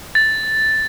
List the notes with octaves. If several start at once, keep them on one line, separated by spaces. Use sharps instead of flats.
A6